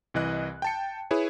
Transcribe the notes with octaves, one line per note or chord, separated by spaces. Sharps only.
C2 E3 D#5 F#6
G5 A5 C#7
E4 G#4 B4 C#5